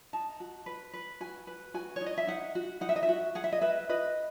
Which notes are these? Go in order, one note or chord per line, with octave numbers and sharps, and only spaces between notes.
D#4 A5
F#4
B4
B4
F#4 G#5
B4
F#4 G#5
C#5
D#4
D#5
E5
D#4 F#5
F#4
D#4 F#5
E5
D#5
E5
F#4
G#4 F#5
E5
D#5
B4 E5
B4 D#5